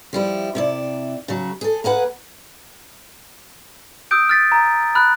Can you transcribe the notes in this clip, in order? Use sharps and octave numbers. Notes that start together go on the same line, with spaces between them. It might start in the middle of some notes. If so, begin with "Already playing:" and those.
F3 G3 E4
C3 E4 D5
C#3 F#3
G#4 A4
A#3 G#4 B4 F#5
D#6 E6 G6 D7
F6 A6 B6
A#5
B5 F6 F#6